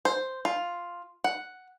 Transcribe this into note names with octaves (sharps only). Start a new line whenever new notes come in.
C5
F4
F#5